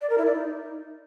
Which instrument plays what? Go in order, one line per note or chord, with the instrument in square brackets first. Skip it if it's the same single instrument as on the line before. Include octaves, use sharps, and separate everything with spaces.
[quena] D5
A#4
E4
D5
D#4